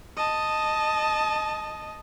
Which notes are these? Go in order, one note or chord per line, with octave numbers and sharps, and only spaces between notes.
D#5 A5